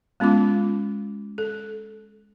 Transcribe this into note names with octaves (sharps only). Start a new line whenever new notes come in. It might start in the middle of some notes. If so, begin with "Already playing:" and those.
G#3 B3 C#4 F4 D6
A4